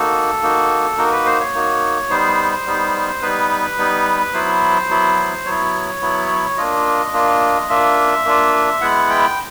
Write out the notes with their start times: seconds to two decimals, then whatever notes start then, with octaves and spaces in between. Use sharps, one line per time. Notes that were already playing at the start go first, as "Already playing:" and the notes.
Already playing: A#3 D#4 F#4 A4
0.42 A#3 D#4 F#4
0.98 A#3 D#4 F#4 A#4
1.12 B4
1.26 C5
1.40 C#5
1.54 A#3 D#4 F#4
2.10 G3 B3 D#4 C5
2.65 G3 B3 D#4
3.22 G3 B3 D#4 B4
3.78 G3 B3 D#4
4.33 F#3 B3 E4 C5
4.89 F#3 B3 E4
5.46 F#3 B3 E4 C#5
6.02 F#3 B3 E4
6.57 A#3 D4 F4 D#5
7.13 A#3 D4 F4
7.69 A#3 D4 F4 E5
8.25 A#3 D4 F4
8.81 G#3 B3 E4 F#5
9.10 G5